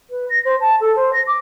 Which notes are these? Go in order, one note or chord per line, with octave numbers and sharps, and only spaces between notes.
B4
A#6
C5
A5
A4
C5
A#6
D6